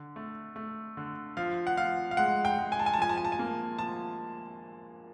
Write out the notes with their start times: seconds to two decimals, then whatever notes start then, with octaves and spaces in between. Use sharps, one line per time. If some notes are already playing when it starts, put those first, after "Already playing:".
Already playing: D3
0.16 A3
0.56 A3
0.97 D3
1.37 F3 F5
1.67 F#5
1.77 F3 F5
2.11 F5
2.17 G#3 F#5
2.45 G5
2.58 G#3
2.72 G#5
2.79 A5
2.86 G#5
2.94 A5
2.99 F3 G#5
3.09 A5
3.17 G#5
3.25 A5
3.32 G#5
3.39 A#3
3.78 F3 A5